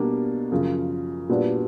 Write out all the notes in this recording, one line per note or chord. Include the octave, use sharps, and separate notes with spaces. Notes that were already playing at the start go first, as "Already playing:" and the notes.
Already playing: B2 G3 A#3 D4
F#2 C#3 F3
A#2 G3 B3 D4 F#4